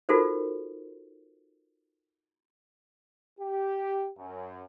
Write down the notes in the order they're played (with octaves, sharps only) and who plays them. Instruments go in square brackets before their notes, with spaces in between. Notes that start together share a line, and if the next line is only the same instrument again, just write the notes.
[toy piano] D#4 F4 F#4 A4 A#4 C5
[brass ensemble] G4
F#2